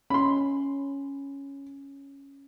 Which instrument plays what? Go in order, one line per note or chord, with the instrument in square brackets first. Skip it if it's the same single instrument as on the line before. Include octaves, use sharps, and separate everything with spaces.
[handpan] C#4 [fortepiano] B5 C6